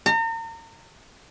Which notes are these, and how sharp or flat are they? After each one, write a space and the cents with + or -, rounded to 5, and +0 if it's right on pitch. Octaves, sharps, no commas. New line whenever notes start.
A#5 -40